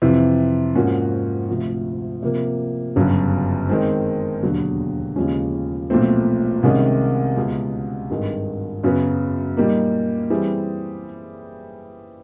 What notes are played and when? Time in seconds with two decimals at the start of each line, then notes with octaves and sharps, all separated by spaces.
0.02 F2 C3 E3
0.75 G#2 F3 A#3 C#4 F#4
1.49 D2 C3 F3
2.23 C3 F3 A#3
2.96 G1 F#2 C#3 F#3
3.69 D#3 G#3 C4
4.42 E1 D#2 D3 F#3
5.16 D#2 C#3 F3 G#3 C#4
5.90 B1 A#2 F3 A3 C4
6.63 C2 C3 D#3 G#3 C#4
7.37 C#2 B2 G#3
8.10 G#1 G2 D#3 G#3
8.84 F#2 C#3 F#3 B3
9.57 A#2 G3 A#3 D#4
10.30 E3 G3 C4 E4 G#4